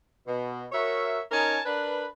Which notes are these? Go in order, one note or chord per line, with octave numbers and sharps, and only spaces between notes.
B2
F#4 A#4 C#5 E5
C#4 D#4 A#4 G#5 A5
D4 A#4 B4